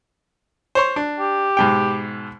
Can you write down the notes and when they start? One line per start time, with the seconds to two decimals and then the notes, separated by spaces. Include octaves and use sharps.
0.75 C5 C#5 C6
0.96 D4
1.19 G4
1.57 G#2 B2 G5